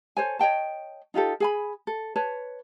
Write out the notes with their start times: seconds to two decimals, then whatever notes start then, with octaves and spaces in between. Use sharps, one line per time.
0.17 A4 C5 C#5 G#5
0.39 C#5 D#5 G5 A5
1.14 D#4 F4 G4 A4
1.40 G#4 G#5 B5
1.87 A4
2.16 B4 C#5 A5